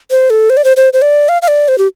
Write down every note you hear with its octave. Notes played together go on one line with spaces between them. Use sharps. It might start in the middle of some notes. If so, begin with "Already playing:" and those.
C5
A4
C5
D5
C5
C5
C5
D5
F5
F5
D5
C5
G4